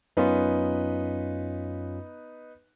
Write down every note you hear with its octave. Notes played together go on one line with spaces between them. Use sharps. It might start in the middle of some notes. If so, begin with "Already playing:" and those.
F#2 B3 C#4 D#4 F4 B4